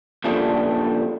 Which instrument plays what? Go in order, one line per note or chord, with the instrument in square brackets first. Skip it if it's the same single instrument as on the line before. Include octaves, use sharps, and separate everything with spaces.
[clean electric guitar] A#2 C#3 F3 G3 A3 D4